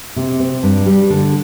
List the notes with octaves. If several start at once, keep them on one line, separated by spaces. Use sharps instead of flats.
C3
C4
G2
G3
D3